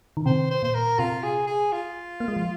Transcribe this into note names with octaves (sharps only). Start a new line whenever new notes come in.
D#3
C3 C5
C5
A#2 C5
A#4
C3 F4
G#4
G#4
F4
A#3
G#3
F3